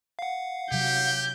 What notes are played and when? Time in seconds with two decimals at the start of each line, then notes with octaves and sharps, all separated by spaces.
0.19 F5 F#5
0.72 C3 F#3 G4 G6